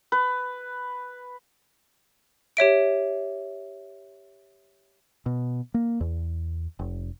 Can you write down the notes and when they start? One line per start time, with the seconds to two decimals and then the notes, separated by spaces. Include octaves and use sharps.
0.12 B4
2.57 G4 C#5 E5 D7
5.26 B2
5.74 A#3
6.01 E2
6.79 F1